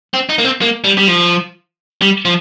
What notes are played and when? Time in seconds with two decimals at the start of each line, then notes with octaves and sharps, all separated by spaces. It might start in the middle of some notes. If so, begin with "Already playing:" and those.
0.14 C4
0.29 D#4
0.39 A#3
0.45 C4
0.62 A#3
0.84 G3
0.98 G3
1.08 F3
2.02 G3
2.25 F3